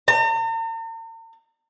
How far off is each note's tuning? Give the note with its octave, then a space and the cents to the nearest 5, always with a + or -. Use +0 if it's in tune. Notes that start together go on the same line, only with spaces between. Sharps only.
A#5 -45